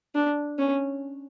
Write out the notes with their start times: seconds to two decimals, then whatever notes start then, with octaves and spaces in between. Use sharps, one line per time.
0.15 D4
0.58 C#4